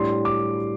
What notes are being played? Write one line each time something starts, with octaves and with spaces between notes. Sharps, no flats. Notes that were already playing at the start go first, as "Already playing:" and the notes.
Already playing: A2 G3 D4 C6
D6